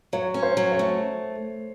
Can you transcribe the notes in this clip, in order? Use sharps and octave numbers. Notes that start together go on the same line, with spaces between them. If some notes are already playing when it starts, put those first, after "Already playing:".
F#3 C#5
C#4
C5
F#3
C#5
A3